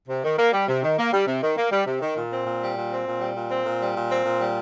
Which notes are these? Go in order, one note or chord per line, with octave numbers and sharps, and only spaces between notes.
C3
D#3
A#3
G3
C3
D#3
A#3
G3
C3
D#3
A#3
G3
C3
D#3
A#2
C4
A#2
G3
A#2
C4
A#2
G3
A#2
C4
A#2
G3
A#2
C4
A#2
G3